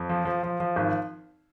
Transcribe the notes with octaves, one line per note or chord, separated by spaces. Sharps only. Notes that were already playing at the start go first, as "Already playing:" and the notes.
Already playing: F2
F3
F3
F3
F3
G#1